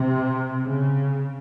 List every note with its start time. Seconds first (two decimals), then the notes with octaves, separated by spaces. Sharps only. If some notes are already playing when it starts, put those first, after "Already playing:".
Already playing: C3
0.65 C#3